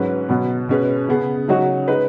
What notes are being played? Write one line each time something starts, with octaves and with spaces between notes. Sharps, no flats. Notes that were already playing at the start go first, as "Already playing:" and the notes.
Already playing: G#2 F#3 C#4 B4
B2 F#3 B3
B2 G#3 C#4 G#4 B4
C#3 B3 G#4
C#3 F#3 D#4 F#4 C#5
G#3 D#4 B4